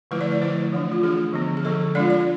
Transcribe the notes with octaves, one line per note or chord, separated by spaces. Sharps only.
D3 F3 A3 E4 B4
D5
D5
D3 F3 A3 E4 C5
E3 A3 D4
F4
E3 A3 D4 G#4
D3 F3 B3
G#4
D3 F3 B3 A4
G#3 D4 F4 D5
D5